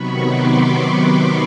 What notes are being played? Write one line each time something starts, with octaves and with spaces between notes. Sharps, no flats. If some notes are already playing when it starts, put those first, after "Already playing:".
Already playing: C3 D#3 F#3 B3 B5 C#6
C6 D6